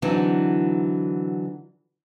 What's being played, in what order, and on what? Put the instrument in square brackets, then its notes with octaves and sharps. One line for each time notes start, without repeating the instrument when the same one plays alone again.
[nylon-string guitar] D3 E3 F#3 C4 D#4